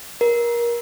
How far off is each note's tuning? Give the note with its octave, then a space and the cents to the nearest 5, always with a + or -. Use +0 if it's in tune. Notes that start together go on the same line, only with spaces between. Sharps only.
A#4 +25